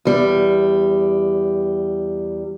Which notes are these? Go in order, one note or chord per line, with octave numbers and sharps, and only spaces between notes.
E2 G3